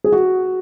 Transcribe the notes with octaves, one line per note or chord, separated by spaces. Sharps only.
G#4
F#4